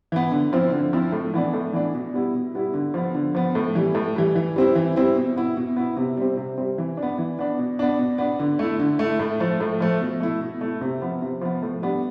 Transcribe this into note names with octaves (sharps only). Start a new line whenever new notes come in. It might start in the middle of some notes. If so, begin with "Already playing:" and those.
E3 B3
D3
F3 C4 E4
D3
F3 C4 E4
A2
E3 B3 D4
A2
E3 B3 D4
B2
G3 B3 E4
B2
G3 B3 E4
D3
F3 B3
D3
F3 B3
A2
E3 G3
A2
E3 G3
E3
G3 C4 E4
E3
G3 C4 E4
B2
B3 E4
B2
B3 E4
C3
G3 C4
C3
G3 C4
E3
D4
B3
E3
B3 D4
B2
B3 D4
B2
B3 D4
D3
A3 E4
D3
A3
E4
A2
F3 A3
A2
F3 A3
B2
A3 E4
B2
A3 E4
C3
F3 B3
C3
F3 B3
A2
G3 B3 D4